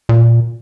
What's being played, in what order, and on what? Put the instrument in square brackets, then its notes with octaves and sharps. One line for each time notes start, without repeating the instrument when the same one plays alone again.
[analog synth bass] A#2